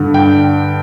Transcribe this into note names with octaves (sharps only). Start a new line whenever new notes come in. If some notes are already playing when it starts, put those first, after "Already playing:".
Already playing: G2 D3
G5